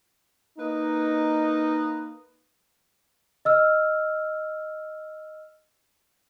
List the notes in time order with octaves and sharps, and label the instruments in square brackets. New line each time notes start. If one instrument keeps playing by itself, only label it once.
[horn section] A#3 D#4 B4 D#5
[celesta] D#5 E6 F6